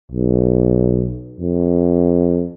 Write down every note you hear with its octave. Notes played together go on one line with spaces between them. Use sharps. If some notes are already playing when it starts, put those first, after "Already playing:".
B1
F2